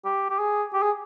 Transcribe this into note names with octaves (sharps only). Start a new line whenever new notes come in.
G4
G4
G#4
G4
G#4